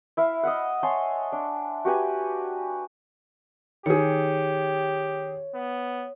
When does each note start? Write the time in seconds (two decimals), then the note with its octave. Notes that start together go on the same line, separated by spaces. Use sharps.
0.17 E4 E5 F5
0.43 D#5 E5 F#5
0.83 C#5 G#5 A5 C6
1.32 D4
1.85 F#4 G4 B4 G#5
3.86 D#3 G4 G#4 C#5
5.55 B3